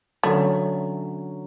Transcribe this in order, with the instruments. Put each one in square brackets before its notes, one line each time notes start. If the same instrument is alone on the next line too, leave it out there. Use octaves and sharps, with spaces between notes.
[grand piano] D3 F#3 C#4 [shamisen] A3